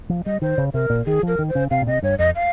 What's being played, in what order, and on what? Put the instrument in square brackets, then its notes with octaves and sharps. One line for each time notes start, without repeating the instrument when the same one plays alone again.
[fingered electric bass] F3
[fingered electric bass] G3 [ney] D#5
[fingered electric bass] D#3 [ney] C5
[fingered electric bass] C#3
[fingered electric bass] C3 [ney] A#4
[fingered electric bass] A#2
[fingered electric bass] D#3 [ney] G#4
[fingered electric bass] F3
[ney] A#4
[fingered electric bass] D#3
[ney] C5
[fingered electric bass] C#3
[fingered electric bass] C3 [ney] F5
[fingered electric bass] A#2
[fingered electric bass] C3 [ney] D#5
[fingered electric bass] G2 [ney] C#5
[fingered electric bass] F2 [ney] D#5
[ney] F5